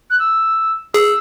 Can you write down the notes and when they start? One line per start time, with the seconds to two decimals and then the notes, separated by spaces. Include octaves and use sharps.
0.10 F#6
0.19 E6
0.94 G#4 E6